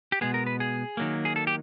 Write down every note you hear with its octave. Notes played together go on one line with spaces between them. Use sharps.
G4
B2 G#3 B3 G#4
A#4
B4
G#4
D#3 F#3 A#3
G#4
A4
G4